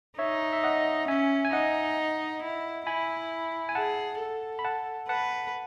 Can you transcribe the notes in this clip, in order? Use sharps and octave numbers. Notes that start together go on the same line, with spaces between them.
D#4 C#5 E5
E5
D#5 F#5
C#4 E5 G#5
G#5
D#4 D#5 F#5
E4
E4 G#5 B5
G#5
G#4 F#5 A5
A4
B5
F#5 A5
B4 F#5 A5